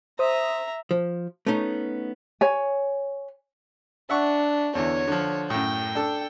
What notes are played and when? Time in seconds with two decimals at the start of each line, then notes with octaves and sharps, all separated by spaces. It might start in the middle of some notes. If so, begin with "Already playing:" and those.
0.19 C5 E5 A#5 D#6
0.91 F3
1.47 A3 B3 C#4 D#4
2.41 C#5 G#5
4.10 D4 E5 F#5 C#6
4.75 E2 D3 E3 C#5
5.07 D3 F3
5.50 F#2 A2 G5
5.95 D4 A4